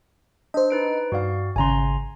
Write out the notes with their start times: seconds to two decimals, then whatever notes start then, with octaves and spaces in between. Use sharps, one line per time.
0.54 D4 C5 D#5
0.70 D#4 B4 D7
1.12 G2 F#4 D5 F5
1.56 G#1 C#3 G#5 A#5 C6